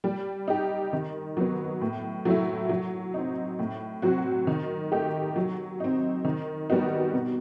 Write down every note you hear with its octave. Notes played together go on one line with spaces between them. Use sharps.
G3
D#4 G4
D#3
F#3 B3
A2
F#3 A3 E4
F#3
C4 D#4
A2
F#3 C4 F#4
D#3
A3 D#4 G4
F#3
C4 D#4
D#3
G3 B3 D#4 F#4
B2